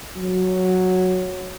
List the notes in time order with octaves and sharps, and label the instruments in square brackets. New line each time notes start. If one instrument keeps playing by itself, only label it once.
[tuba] F#3